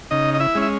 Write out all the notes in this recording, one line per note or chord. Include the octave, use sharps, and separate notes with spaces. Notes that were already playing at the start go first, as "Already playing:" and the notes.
C#3 D#4 D#5
D#5
E4 E5
G#3 C#4
E5